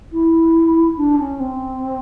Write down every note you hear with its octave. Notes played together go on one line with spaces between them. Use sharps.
E4
D4
C#4
C4